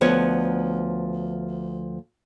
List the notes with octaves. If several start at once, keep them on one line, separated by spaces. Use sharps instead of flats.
D2 F3 B3 C#5